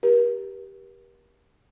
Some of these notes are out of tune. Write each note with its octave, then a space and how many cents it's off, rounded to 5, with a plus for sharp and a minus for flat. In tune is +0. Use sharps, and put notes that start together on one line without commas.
G4 +0 A#4 +40